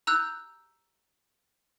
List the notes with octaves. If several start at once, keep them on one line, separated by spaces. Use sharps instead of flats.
A#5 E6 F#6 G6